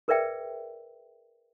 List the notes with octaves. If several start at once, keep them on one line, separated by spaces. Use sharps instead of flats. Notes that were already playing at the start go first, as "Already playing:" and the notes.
G#4 A#4 B4 D5 E5 G5